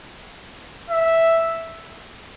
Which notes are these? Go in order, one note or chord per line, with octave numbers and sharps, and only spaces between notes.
E5